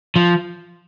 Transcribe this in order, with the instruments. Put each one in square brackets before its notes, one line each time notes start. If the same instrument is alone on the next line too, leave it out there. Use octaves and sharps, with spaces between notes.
[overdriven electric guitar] F3